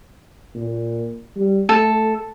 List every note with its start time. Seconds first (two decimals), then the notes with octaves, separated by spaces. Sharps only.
0.55 A#2
1.36 G3
1.69 A3 A4